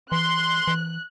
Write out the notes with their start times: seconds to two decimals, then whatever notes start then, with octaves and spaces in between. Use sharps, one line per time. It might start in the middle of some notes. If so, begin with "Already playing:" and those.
0.12 E3 C6 F#6
0.68 E3